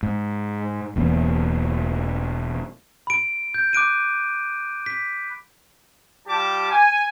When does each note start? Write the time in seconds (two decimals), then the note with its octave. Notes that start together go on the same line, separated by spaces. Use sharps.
0.03 G#2
0.96 E1 E2 A#3
3.07 B5 D7
3.54 G6
3.73 D6 F#6 D7 D#7
4.86 B6
6.28 G3 F4 G4 A5 D6
6.70 G#5